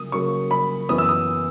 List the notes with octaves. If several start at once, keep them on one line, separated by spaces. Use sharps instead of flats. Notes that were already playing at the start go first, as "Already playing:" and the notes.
Already playing: C#3 F#3 A#3 D#6
C#3 F#3 A#3 C#6
B5
F#2 E3 B3 D#6
E6
D#6